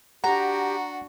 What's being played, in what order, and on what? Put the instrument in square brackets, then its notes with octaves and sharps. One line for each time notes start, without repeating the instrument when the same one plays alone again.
[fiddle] D4 F#4 [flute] G4 [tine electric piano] F#5 [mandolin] A#5